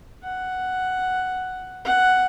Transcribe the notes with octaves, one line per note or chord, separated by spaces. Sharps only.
F#5
F#5